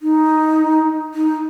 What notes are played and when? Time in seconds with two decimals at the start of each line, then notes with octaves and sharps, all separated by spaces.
0.02 D#4
1.14 D#4